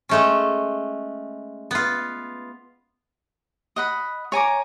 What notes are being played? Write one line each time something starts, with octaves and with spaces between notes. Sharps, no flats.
G#3 A3 C#4
B3 F4
D#5 F#5 B5
C#5 G#5 A#5 D6